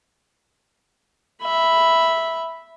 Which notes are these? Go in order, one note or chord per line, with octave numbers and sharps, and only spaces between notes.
E5 B5